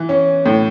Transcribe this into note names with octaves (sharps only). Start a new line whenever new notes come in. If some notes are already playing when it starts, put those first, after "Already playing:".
Already playing: E3
C#4
A2